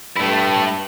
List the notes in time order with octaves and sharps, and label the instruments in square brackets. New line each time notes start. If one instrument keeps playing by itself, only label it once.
[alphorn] G2 [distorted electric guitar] A3 E4